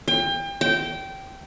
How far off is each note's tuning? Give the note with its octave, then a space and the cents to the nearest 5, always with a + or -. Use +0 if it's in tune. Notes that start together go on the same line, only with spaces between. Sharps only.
G5 +30
G5 -15